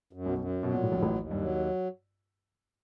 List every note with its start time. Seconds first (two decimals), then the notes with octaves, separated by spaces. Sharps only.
0.13 F#2
0.26 B1 B2
0.38 F#2
0.63 B2 F#3
0.74 A#2
0.82 A2
0.89 A#1 D#2 A#2
1.02 A1 A2
1.15 D#2
1.31 G2
1.41 F#3